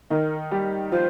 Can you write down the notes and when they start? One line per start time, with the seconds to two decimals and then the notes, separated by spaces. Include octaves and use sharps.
0.10 D#3 D#4 A#4
0.51 G3 G4
0.92 F3 F4 C5